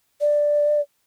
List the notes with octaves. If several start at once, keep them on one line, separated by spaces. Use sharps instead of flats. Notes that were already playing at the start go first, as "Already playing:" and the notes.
D5